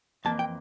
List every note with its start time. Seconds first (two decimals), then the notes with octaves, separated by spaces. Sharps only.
0.25 F2 E3 A#3 A5
0.39 G5